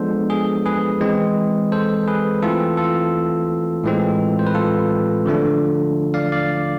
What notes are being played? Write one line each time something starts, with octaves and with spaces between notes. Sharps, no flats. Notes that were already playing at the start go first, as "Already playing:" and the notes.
Already playing: F3 G#3 B3 D4 A4 C5
G#4
G#4 B4
E3 G#3 C4
A4 C5
G#4 B4
E3 A3 C4 F4 A4
F4 A4
A2 E3 G#3 C4
C5
B4
F4 A4
D3 F3 A3 D4
D5 F5
D5 F5